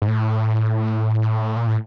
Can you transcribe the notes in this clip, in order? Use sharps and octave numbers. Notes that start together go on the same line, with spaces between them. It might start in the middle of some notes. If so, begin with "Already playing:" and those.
G#2
A2
A#2
A2